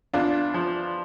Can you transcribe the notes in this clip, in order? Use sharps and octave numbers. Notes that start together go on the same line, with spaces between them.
E2 D4 F4
F3